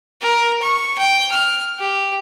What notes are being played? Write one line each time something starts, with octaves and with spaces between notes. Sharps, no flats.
A#4
C#6
G5
F6
G4